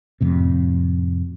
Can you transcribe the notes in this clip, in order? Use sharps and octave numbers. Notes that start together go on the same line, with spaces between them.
F2 A2 C3